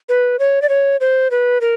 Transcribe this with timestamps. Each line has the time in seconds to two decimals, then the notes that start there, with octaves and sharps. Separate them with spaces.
0.09 B4
0.39 C#5
0.62 D5
0.69 C#5
1.01 C5
1.31 B4
1.61 A#4